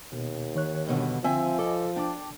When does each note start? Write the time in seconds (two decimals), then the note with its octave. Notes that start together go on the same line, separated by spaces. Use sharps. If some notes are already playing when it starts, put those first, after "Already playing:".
0.13 D#2 B2
0.55 D#3 C#5 F#6
0.87 G2 B2 D3
1.24 D3 F3 C4 E5 G#5
1.59 A4 D#5 G#5 D6
1.96 D4 G5 A5 D6